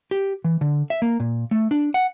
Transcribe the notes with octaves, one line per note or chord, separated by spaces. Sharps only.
G4
E3
D3
E5
A#3
A#2
A3
D4
F#5